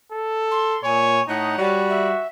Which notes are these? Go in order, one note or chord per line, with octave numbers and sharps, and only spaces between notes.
A4
C6
A#2 C#5 G#5
A2 D#4 C#5 D#5 F#5
G3 F#4
E5